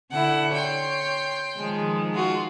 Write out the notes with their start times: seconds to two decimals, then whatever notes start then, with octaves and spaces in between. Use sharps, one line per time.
0.11 D3 E4 F#5
0.53 C#5 G5 C6
1.56 D#3 F3 G#3
2.13 F4 F#4